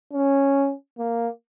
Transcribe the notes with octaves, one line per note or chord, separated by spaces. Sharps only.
C#4
A#3